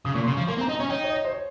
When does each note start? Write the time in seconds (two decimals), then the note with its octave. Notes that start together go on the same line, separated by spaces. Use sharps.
0.05 C#3 D#6
0.14 A#2 C#6
0.24 C#3 C6
0.32 F3 C#6
0.48 A#3 C6
0.58 C4
0.61 A#5
0.69 D#4
0.75 C#4 A#5
0.89 D#4 G5
1.04 C#5
1.10 D#5
1.25 C5
1.31 C#5